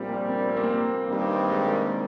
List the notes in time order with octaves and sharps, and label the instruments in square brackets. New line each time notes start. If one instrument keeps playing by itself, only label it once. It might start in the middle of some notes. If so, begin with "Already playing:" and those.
Already playing: [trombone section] A#1 A#2 G3 [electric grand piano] C4
[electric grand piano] A#3
C4
A#3
C4
A#3
[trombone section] G2 D#3 G3
[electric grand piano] C4
G#3
A#3